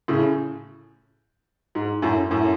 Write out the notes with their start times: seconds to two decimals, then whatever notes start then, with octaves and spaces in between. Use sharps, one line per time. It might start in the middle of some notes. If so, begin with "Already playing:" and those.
0.08 A2 C#3
1.75 G#2
2.02 F#2 A2
2.31 F#2 A2